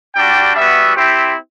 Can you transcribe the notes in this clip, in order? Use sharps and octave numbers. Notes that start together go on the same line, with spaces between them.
G3 D4 F#4 G5
G3 B3 F#4 E5
C4 E4 G4 C5